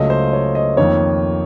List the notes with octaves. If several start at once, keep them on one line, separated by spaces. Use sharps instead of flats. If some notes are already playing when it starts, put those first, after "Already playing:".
Already playing: C#2 C#3 F#3 A3 D#5
C5
C#5
D#5
F2 D#3 A#3 C#5